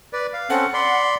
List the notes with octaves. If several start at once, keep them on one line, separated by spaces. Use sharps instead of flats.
B4 D5
F5
C4 C#4 A4 F#5
D5 B5 C6